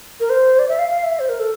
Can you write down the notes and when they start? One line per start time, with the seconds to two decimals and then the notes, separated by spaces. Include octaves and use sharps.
0.20 A#4
0.30 C5
0.59 D5
0.69 E5
0.79 F5
0.90 F5
1.04 E5
1.20 C5
1.29 A#4
1.40 A4